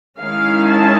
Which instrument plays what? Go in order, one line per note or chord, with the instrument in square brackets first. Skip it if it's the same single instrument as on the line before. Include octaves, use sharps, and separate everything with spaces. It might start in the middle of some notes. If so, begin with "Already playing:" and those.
[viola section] D#3 G#3 C#4 E4 F5
A5